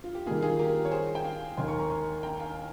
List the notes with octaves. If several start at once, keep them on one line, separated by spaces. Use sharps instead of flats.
F4
G4
D#3 G3 A#3 F4 G#4
F4 G#4
G4 A#4
C#5
G#4 C5
G5
F5 G#5
D#2 D#3 A#3 G#5 C6
A#5 C#6
A#5 C#6
G#5 C6
G5 A#5
F5 G#5